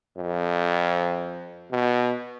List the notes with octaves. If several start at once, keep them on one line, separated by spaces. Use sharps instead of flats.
F2
B2